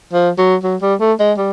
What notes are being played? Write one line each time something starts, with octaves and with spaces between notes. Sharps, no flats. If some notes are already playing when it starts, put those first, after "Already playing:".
F3
F#3
F#3
G3
A3
G#3
G3